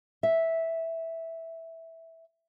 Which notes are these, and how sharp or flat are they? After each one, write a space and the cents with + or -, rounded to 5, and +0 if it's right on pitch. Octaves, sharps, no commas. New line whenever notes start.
E5 -10